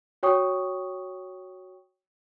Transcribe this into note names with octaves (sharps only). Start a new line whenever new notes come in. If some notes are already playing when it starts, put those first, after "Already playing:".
F#4 C#5 G5 C#6 D#6